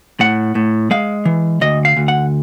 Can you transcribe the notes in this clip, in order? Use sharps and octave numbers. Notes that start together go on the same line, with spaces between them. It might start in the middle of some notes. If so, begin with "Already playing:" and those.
A2 F#5
A2
G#3 F5
E3
D2 D#5
F5
D2
F#5